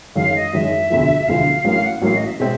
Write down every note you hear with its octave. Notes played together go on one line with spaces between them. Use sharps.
F#2 D#3 G#3 F5
D#5
F#2 D#3 G#3 E5
E1 D2 D3 F3
E1 D2 D3 F3 F5
A1 A2 F#3 A#3 F5
F#5
A1 A2 F#3 A#3 F5
D#5
E5
B2 G#3 C4 E5